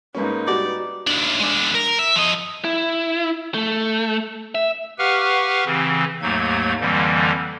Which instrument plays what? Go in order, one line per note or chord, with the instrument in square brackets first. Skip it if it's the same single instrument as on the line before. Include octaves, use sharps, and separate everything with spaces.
[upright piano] G#2 A#3 C#4 [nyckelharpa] D#4 B4
[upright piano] G3 [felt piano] F#4 [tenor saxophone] D5
[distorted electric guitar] D#2 D4
G#3 D4
A#4
E5
F3 D#5
[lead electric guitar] E4
A3
E5
[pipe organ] G4 B4 F5 F#5 C#6 F6
C#3 E3 C4
D#2 G#2 F#3 A3 A#3 G#6
F2 D3 E3 G3 A#3